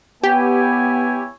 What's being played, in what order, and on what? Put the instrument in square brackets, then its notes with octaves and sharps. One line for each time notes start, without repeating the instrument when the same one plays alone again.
[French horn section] B3 [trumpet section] E4 C#5 G#5 [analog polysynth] G4